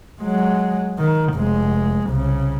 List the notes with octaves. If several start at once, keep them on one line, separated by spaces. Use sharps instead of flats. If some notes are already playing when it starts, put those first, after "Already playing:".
F#3 G#3
D#3
F1 G#3
C2 C#3